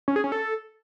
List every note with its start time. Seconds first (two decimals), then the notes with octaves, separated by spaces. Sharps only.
0.08 C#4
0.16 G#4
0.24 C#4
0.32 A4